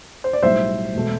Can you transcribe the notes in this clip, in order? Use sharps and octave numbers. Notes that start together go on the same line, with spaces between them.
C5
D5
B1 A2 G3 C5 E5
E1 B2 A3